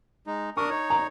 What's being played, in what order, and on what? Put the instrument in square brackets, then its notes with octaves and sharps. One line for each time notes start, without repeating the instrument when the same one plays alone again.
[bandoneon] G#3 D#4
[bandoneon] D4 A#4 D#6 [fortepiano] C#6
[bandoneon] D#4 C#5
[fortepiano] A#5